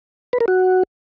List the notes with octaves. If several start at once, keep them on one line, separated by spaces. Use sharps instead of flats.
B4
A#4
F#4